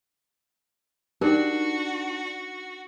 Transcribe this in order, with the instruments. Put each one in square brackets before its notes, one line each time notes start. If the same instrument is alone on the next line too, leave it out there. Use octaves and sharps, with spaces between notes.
[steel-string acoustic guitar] D4 [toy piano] D#4 A#4 [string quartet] F#4 [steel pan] G4